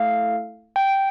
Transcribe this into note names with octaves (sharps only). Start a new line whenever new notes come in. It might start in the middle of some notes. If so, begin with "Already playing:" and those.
Already playing: A3 E4 A4 F5
G5